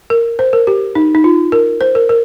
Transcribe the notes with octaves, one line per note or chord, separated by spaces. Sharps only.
A#4
C5
A#4
G4
D#4
D#4
F4
A#4
C5
A#4
A#4